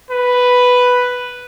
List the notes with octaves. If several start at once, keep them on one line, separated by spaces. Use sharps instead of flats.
B4